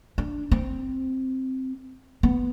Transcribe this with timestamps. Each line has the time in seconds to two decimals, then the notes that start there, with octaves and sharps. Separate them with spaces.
0.18 D4
0.52 C4
2.23 B3